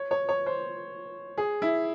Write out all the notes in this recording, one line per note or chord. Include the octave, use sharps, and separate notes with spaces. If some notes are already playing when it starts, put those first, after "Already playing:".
Already playing: C#5
C#5
C#5
C5
G#4
E4